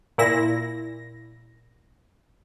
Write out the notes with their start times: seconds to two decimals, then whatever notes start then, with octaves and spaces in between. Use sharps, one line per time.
0.18 A#2 E4 A#6